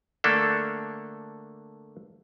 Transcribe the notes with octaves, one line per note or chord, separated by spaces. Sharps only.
D3 A3 A#3 D4 A4